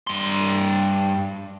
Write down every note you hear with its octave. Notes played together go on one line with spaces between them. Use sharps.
G2 C6